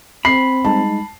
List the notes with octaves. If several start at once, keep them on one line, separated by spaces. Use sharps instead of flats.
C4 B5 C7
G3 G#3 D#4 A5